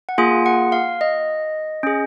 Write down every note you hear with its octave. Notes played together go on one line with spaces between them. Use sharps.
F#5
A#3 F4 G#4 G#5
F#5
F5
D#5
C#4 G#4